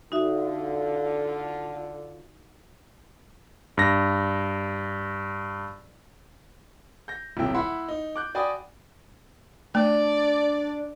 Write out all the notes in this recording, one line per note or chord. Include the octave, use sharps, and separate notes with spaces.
D3 D#4 F4 F#4 E5
G2 A#6
G6 A#6
D#1 B1 C3 E4 G5
E4 F#5 B5 C6
D#4
D6 F#6 G6
F#4 D5 G5 G#5 B5 D#6
A3 D4 D5